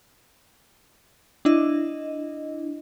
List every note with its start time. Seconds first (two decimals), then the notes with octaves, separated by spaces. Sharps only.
1.45 D4 E4 D#5